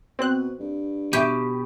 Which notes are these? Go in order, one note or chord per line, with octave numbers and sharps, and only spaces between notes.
B2 C4 F#6
G2
B2 G4